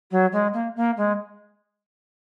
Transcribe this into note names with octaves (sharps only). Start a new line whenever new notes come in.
F#3
G#3
A#3
A#3
G#3